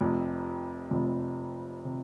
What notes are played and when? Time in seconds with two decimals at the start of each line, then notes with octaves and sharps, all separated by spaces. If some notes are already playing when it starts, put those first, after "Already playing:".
0.01 F1 F2 C3
0.91 F1 F2 C3
1.85 C3